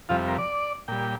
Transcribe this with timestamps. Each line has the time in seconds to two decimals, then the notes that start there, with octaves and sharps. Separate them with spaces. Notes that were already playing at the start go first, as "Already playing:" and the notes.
0.09 F2 C3 G3 F4
0.28 A#4
0.38 D5
0.88 A#2 G3 G5